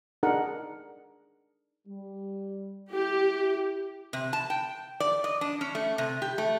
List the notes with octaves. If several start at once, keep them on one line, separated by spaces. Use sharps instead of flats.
D4 D#4 G#4 A#4 F#5
G3
E4 G4
C3
A5
G5
D5
D#5
D4
C#4
A3
C3
G4
A3